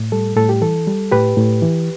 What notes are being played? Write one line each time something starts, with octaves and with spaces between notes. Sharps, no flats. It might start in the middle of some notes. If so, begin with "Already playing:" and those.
Already playing: A2
G3 A4
A2 A4
G4
E3 A4
G3
A2 G4 B4
A2
E3